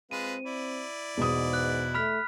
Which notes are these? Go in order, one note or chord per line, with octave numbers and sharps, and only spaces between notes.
G#3 C4 F4 B4 D#7
E4 D5
E2 G#2 B2 D#6
F#6
A3 B5 F6 B6